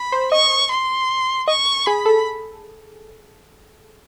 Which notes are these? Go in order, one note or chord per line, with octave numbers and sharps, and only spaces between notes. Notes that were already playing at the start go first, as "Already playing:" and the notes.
Already playing: B5
C5
D#5 C#6
C6
D#5 C#6
G#4 B5
A4